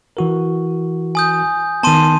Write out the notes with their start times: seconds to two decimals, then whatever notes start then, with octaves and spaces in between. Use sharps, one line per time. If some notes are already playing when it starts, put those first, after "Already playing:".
0.17 E3 F#4 A#4
1.15 G#5 D#6 G6
1.83 D#3 B3 A5 C6 D#7